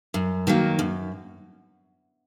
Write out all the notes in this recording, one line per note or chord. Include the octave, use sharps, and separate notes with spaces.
F#2
D#3 F#3 A#3
F#2